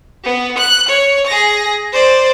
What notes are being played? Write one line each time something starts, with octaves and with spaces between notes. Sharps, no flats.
B3
F#6
C#5
G#4 A#6
C5 D5